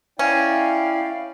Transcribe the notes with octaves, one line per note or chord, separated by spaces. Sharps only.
C#4 E4 D5 F5 G5